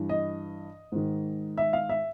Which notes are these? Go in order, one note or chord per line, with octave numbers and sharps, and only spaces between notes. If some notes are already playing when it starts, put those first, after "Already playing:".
Already playing: G2 E3
D#5
G#2 D#3
E5
F5
E5